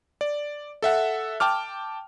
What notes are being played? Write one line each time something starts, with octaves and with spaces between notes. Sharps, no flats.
D5
A4 E5 F#5
G5 A5 D6 F6